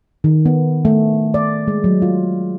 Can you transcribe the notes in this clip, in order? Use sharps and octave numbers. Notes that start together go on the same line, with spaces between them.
D#3
B3
A3
D5
G#3
F#3
F4